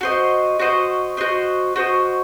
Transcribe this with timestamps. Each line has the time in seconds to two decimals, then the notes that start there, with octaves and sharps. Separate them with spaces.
0.01 F#4 C5 D#5
0.59 F#4 C5 D#5
1.17 F#4 C5 D#5
1.76 F#4 C5 D#5